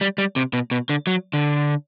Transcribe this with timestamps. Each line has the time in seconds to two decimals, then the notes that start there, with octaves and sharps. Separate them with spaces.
0.01 G3
0.18 G3
0.36 C3
0.53 B2
0.71 B2
0.89 D3
1.07 F#3
1.33 D3